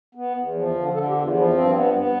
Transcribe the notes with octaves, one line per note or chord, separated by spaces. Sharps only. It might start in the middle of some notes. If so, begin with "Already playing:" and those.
B3
E2
F3
D3
D3 A4
G4
E2
F4
F3
E4
G2 C4
B3
B3